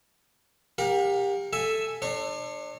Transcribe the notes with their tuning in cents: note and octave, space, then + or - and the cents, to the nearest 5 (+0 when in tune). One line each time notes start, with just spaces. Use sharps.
G4 +20 A#4 +0 F#5 -45
A4 +0 E5 +0 G#5 +0
D4 +35 C#5 -20